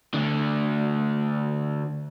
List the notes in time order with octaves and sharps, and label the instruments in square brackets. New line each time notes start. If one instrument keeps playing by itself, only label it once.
[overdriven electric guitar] D2 D3